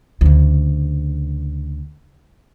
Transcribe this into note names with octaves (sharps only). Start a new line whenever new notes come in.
D2 C#3